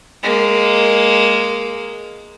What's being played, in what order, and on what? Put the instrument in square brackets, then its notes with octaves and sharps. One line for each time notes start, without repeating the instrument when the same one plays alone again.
[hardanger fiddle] G#3 A#3